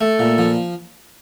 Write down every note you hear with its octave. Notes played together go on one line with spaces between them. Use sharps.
A3 A4
A#2
F3